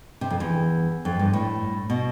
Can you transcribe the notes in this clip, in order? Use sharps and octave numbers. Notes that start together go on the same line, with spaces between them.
C3
F2
E2
F2
G2
A2
B2